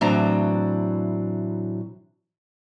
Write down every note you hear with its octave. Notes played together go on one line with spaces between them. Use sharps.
A2 E3 F#3 C4 D4 A#5